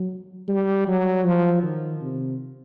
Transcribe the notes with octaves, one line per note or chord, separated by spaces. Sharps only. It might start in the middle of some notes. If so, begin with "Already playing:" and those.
Already playing: F#3
G3
F#3
F3
D#3
C3